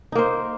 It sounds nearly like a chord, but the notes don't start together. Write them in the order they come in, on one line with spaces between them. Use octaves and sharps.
D#4 A#3 C5